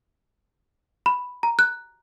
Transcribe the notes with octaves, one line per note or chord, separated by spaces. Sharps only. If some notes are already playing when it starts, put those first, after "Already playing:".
B5
A#5
F#6